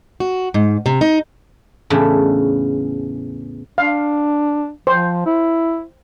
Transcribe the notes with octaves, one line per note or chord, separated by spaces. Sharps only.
F#4
G#2
C3
D#4
E2 A2 C#3 D4 E5
D4 F5
F3 C5
E4